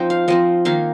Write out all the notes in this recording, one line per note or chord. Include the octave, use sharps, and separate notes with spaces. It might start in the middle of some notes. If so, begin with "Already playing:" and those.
Already playing: F3 C4 D#4 G5
F5
F3 C4 D#4 D#5
D#3 A#3 D#4 F5